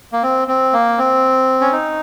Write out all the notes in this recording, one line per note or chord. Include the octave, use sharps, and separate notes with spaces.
A#3
C4
C4
A#3
C4
C#4
D#4